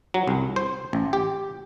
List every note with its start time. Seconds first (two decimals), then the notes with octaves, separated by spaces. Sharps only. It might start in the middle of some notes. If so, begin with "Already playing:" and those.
0.14 F#3
0.27 C2
0.56 C5
0.93 A1
1.13 G4